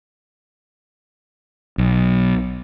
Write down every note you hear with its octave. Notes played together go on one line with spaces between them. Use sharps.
B1